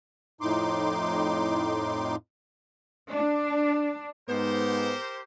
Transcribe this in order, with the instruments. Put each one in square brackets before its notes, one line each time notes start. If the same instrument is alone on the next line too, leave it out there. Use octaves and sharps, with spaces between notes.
[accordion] F2 A2 D#4 C6 D6
[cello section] D4
[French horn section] G#2 [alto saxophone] B3 [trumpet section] G4 A#4 C5